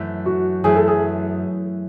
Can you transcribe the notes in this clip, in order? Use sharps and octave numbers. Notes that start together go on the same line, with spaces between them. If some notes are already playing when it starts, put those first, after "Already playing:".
Already playing: F#2 E3 A3 E4
F#4
F#2 E3 A3 E4 G#4
A4
G#4